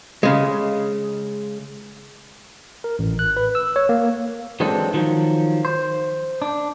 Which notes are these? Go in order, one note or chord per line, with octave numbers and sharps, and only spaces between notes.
C#3 G#3
A#4
A1
F#6
B4
E6
C#5
A#3
E3 F#3 G#3 C4 D4 A4
D#3 F3 F#3
C5
D4